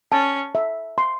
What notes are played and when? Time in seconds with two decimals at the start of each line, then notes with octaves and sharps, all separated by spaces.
0.12 C#4 A5
0.55 E5
0.98 C6